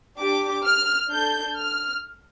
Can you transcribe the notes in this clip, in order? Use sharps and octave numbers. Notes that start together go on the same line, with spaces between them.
D4 G4 D6
F6
D4 A4 G6
F6